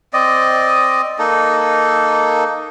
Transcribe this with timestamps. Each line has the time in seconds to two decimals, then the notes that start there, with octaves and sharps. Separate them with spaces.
0.13 C4 D5 D#5
1.19 A#3 D#4 A4